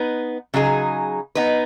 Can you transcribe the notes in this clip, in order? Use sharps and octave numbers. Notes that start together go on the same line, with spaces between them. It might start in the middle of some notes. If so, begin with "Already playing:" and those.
Already playing: B3 D#4 B4
C#3 F#3 D#4 G#4
B3 D#4 B4